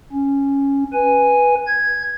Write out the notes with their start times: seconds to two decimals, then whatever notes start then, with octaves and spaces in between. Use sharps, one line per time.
0.12 C#4
0.93 B4 G#5
1.67 G#6